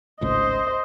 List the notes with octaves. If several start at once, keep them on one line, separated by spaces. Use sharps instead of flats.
G#1 C#2 A2 C5 D#5